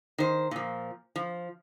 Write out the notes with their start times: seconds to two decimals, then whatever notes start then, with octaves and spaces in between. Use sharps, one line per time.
0.18 D#3 C5
0.51 A#2 F3
1.16 F3